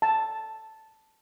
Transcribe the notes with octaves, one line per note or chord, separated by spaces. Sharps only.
A5